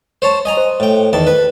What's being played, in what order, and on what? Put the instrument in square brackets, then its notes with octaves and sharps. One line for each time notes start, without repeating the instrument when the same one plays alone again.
[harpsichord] C5 C#5 A5
D#5 G#5 A#5
[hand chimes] C5
[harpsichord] A2 G5
E2 D#3 A5
B4